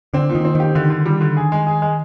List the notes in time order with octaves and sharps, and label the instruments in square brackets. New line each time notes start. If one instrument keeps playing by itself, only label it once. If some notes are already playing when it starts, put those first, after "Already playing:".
[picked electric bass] D3 [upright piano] C4
[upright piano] A#2
[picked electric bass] D#3
[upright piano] C4
[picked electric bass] D#3 [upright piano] G4
[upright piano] D3 [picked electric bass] D#3
[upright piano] D3
G3
D3
G#4
G#3
G#4
G#3